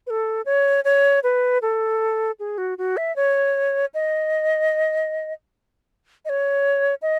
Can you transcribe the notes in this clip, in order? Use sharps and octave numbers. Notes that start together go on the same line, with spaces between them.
B4
A4
C#5
C#5
B4
A4
G#4
F#4
F#4
E5
C#5
D#5
D#5
C#5
D#5